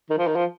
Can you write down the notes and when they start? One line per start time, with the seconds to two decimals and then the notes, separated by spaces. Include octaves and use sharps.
0.10 D#3
0.18 F3
0.27 D#3
0.36 F3